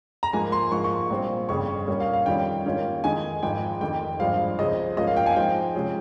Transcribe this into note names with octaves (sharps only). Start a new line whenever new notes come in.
A#5
G#2 F3 A#3 G#5
C6
G#2 F3 A#3 C#6
C#6
A#1 A#2 G3 C4 F4
G1 F2 C#3 G3 C#6
A#2 G3 A#3 C#4
F5
F5
F2 D#3 G3 C#4 F4 G5
G#2 D#3 A#3 C#4 F4
F2 D#3 G#3 D#4 G#5
G#1 G#2 F3 G5
F1 F2 D#3 G5
G#1 G2 F3 G#3 C4 F5
C#2 C#3 F3 C4 D#5
G#2 F3 A#3 C#4 F4 D#5
F5
G5
G#5
F5
G#2 F3 C4 D#4 G5
C3 F3 G#3 C#4